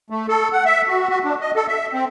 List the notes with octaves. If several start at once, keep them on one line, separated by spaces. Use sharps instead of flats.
A3
A4
F#5
E5
F#4
F#4
D4
D#5
A4
E5
C4